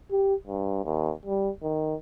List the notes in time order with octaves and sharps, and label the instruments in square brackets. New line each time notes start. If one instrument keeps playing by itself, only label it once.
[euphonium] G4
G2
D#2
G3
D#3